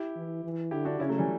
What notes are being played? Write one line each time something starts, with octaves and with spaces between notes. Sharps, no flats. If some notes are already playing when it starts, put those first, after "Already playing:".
Already playing: E4 G4
E3
E3
D3 E4 G4
D4 F#4
C#3 C#4 E4
F#3 A3
E3 G3